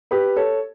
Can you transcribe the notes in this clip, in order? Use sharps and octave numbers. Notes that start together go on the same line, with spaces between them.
G4 B4
A4 C#5